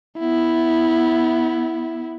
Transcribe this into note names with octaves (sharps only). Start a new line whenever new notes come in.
B3 E4